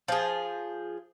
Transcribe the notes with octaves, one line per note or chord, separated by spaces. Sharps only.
F3 G#4